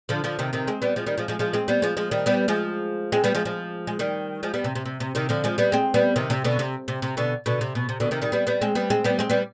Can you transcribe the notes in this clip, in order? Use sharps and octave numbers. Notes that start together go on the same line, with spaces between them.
D3 F3
D3 F3
C3 D#3
C3 D#3
G#3 C4
G3 B3
F3 G#3
D#3 G3
F3 G#3
F3 G#3
F3 G#3
G#3 C4
G3 B3
F3 G#3
F3 G#3
D#3 G3
G3 B3
F3 G#3
G#3 C4
G3 B3
F3 G#3
F3 G#3
G#3
D#3 G3
F3 G#3
G3 B3
C3
C3
C3
C3
C3 D#3
D3 F3
F3 G#3
G3 B3
G#3 C4
G3 B3
C3 D#3
C3
B2 D3
C3
C3
C3
B2 D3
B2 D3
C3
B2
C3
B2 D3
C3 D#3
D#3 G3
G3 B3
G3 B3
G#3 C4
G3 B3
G#3 C4
G3 B3
G#3 C4
G3 B3